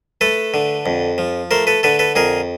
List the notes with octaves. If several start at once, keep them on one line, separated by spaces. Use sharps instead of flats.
A3 A4 B4
D3
F2
F3
A3 A#4 C5
A4 B4
D3 A4 B4
A4 B4
F2 G#4 A#4